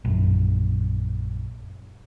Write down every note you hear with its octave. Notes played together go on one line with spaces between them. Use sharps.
A#1 F#2